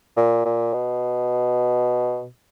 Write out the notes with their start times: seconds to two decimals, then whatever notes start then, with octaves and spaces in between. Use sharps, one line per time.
0.17 A#2
0.45 A#2
0.74 B2